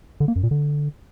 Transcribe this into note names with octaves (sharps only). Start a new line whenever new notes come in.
D3
A#3
F#2
A#2
D3